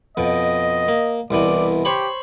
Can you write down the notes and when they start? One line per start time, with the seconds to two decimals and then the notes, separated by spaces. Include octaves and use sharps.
0.17 F2 B2 D#5
0.88 A#3
1.31 C2 B2 E3 D5
1.85 G4 C5 C#5 B5